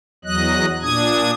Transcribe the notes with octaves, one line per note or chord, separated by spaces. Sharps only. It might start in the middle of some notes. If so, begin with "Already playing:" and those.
E2 F#3 D#5 F#6
A#2 D4 D#6 G#6